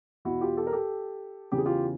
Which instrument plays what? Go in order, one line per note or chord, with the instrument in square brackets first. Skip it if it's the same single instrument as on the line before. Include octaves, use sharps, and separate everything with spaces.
[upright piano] E2 B2 E4 F#4
F4 G4
G4 A4
A#4
G4 A4
E2 C#3 E3 G4
G#4
F4 G4